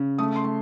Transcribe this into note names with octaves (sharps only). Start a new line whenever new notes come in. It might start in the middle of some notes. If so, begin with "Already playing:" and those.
Already playing: C#3
A3 D#6
C6
A3